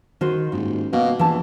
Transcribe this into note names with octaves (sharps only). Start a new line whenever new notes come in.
D#3 F#4 C5
D#1 G#2
B2 A#3
A#1 E3 A5